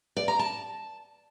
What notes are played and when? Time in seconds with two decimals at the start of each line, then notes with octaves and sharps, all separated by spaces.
0.17 D5
0.28 A#5
0.39 A5